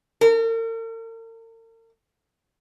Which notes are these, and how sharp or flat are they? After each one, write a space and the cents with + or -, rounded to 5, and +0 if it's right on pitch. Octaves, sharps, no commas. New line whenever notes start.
A#4 -45